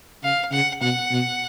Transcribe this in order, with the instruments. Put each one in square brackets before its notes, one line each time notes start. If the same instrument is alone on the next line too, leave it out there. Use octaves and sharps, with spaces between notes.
[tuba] C#3 [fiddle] F5
[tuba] C#3 [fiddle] F#5
[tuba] B2 [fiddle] F#5
[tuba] B2